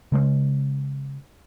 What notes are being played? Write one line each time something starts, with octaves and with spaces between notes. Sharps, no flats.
C#3 G#3 A3 C#4